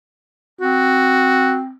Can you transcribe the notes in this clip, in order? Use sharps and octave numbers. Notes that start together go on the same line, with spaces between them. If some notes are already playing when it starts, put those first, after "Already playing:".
C4 F#4